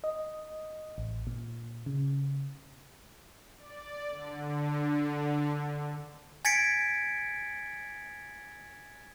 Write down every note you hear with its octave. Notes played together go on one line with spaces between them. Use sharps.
D#5
A1
A#2
C#3
D5
D3
G#5 G#6 A6 B6 C#7 D7